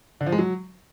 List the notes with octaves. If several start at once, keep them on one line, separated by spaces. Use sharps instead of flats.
D3
F3
G#3
F#3